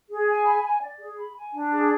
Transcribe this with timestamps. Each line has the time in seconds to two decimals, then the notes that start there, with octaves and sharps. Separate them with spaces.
0.09 G#4
0.28 G#5
0.45 B5
0.64 G#5
0.82 D5
1.00 G#4
1.17 B5
1.35 G#5
1.53 D4
1.72 G#4